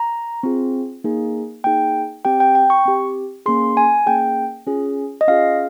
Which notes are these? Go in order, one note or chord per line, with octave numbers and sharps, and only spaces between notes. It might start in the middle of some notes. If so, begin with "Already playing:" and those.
Already playing: A#5
C4 F4 G#4
A#3 D#4 G#4
A#3 D#4 G#4 G5
C4 G4 G5
G5
G5
C#6
C4 G4
A#3 C#4 G#4 C6
G#5
A#3 C#4 G#4 G5
C#4 F4 G#4
D#5
C#4 F4 G#4 F5